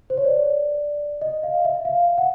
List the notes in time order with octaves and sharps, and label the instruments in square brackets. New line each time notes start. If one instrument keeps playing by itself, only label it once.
[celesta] C5
C#5
D5
D#5
F5
E5
F5
F#5